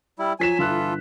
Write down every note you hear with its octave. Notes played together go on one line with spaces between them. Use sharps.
G3 E4
F3 F#3 G#5 B6 E7
G1 E3 F4 A4 F#6